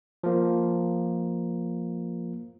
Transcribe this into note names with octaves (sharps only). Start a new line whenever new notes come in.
F3 A#3